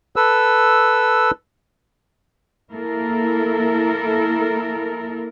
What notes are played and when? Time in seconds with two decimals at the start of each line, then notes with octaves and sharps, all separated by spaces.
0.16 A4 B4 E6
2.72 A#3 E4 A4 A#4